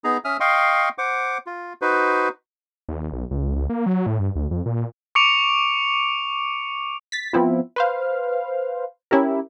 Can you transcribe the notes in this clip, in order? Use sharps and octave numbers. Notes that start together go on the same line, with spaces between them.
B3 D#4 G#4 A#5
C#4 E5 D#6 F6
D#5 F5 G5 C6 C#6
C5 F#5 D6
F4
D#4 F#4 B4 C5
D#2
B1
C#2
C#2
A#3
F#3
A2
G2
D2
F2
A#2
C#6 D6 C#7 D7 F7
A6 B6
F3 B3 C4 E4 F4
B4 C5 F5
C#4 E4 G4 A#4